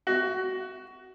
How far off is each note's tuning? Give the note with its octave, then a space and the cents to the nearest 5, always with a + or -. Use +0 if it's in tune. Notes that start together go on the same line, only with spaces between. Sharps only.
F#4 +15